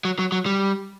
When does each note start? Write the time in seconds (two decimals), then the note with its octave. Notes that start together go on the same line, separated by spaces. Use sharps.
0.05 F#3
0.19 F#3
0.32 F#3
0.46 G3